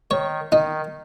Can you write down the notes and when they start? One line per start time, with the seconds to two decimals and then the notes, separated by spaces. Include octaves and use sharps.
0.11 D#3 C#5
0.52 D#3 D#4